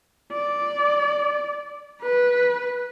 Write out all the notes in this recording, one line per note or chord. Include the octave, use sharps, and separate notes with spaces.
D5
B4